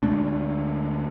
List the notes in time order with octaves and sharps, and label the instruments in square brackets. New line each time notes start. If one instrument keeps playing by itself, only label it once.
[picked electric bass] D2 G#3 A3 D4